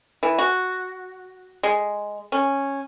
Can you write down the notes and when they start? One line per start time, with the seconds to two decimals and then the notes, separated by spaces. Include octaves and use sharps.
0.23 E3
0.38 F#4
1.63 G#3
2.32 C#4